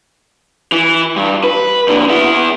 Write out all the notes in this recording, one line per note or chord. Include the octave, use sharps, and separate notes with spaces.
E3
G2
B4
A#2 D3
B3 E4